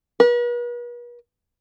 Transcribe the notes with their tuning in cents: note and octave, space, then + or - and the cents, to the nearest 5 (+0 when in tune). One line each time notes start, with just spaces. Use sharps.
B4 -45